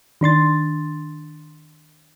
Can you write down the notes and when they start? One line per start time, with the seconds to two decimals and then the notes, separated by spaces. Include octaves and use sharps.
0.21 D#3 D4 C6 A6